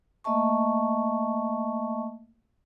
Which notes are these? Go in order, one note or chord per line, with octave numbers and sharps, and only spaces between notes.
A3 A#3 D#5 E5 A5 C#6